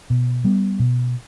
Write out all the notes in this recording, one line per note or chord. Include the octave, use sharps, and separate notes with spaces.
B2
G3 B3
B2